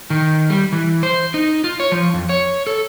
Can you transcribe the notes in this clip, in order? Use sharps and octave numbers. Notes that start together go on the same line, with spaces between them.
D#3
G3
E3
C5
D#4
F4
C#5
F3
F2
C#5
A4